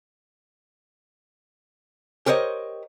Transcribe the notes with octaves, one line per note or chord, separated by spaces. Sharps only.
G4 A#4 C5 C#5 D#5